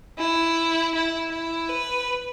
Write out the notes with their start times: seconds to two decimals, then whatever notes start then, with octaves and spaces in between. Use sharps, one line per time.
0.18 E4
0.95 E4
1.31 E4
1.69 B4